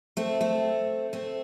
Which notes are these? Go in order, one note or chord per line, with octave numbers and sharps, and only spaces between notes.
A3 C4
A3 C4
A3 C4